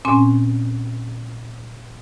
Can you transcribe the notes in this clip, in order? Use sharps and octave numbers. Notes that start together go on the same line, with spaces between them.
A#2 C4 C#4 G#5 C6